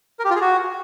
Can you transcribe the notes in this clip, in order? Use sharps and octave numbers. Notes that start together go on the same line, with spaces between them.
A#4
G4
F4
G#4
F#4